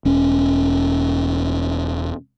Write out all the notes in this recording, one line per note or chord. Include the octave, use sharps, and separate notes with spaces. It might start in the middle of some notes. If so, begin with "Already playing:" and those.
E1 C#4